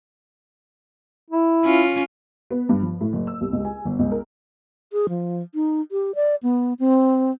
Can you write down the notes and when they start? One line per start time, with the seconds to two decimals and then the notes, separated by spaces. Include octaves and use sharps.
1.30 E4
1.65 C#4 F4
2.51 B3
2.69 G2
2.82 F3
3.01 A2
3.13 F#1
3.27 E6
3.41 C2
3.53 C#2
3.65 G#5
3.85 G1
3.99 C#2
4.11 A#4
4.93 G#4
5.09 F3
5.55 D#4
5.92 G4
6.15 D5
6.43 B3
6.80 C4